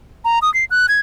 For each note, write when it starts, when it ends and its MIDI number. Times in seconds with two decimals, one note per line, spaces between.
0.25 0.39 82
0.42 0.52 87
0.54 0.65 96
0.71 0.86 90
0.88 1.00 92